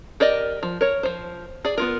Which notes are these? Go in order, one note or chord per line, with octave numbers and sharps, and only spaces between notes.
G4 A#4 D5 D#5
F3
A#4 C#5
F3 C5
G#4 D5
B3 F4 A#4